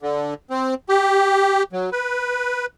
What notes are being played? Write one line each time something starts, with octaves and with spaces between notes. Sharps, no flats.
D3
C4
G4
F#3
B4